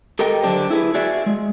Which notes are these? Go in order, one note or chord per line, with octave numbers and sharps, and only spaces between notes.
G4 A4 A#4 D#5 G5
D3 F#3 D4 G4 C5
E4 G#4 A#4 B4
F#4 G#4 D5 E5
G#3